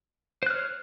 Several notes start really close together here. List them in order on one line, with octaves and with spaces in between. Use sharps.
C5 F#6 F6 C#5